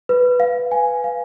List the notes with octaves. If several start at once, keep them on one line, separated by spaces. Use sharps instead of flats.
B4
F5
G#5
F5